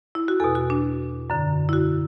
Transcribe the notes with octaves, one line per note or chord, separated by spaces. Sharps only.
E4
F#4
E2 B2 A4
F#4
D4
F#2 D3
E4
F#4